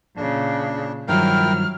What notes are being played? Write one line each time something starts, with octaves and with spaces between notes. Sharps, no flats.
A#2 C#3 D4
G2 D#3 F3 F#3 E4 A#4 G5 F6